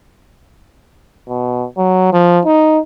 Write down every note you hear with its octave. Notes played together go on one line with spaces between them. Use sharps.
B2
F#3
F3
D#4